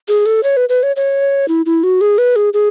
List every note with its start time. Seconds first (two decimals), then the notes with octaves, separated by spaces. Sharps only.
0.08 G#4
0.26 A4
0.43 C#5
0.57 B4
0.69 B4
0.83 C#5
0.96 C#5
1.48 E4
1.66 E4
1.83 F#4
2.01 G#4
2.18 B4
2.36 G#4
2.54 G#4